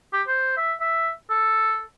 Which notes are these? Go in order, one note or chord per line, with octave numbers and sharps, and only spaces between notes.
G4
C5
E5
E5
A4